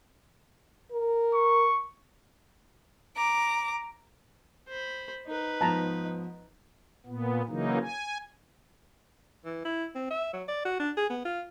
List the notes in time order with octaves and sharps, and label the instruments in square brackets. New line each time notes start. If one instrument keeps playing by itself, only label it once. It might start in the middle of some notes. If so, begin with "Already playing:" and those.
[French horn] A#4
[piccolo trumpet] C#6
[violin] A#5 D6
[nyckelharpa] C5 B5
D#4 B4
[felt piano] G#2 F3 B3 [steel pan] A5 A#5
[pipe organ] A#2 B3
C#3 E3 F#3 A#3 D#4
G#5
[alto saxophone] E3
E4
C4
E5
F#3
D5
F#4
D4
G#4
B3
F4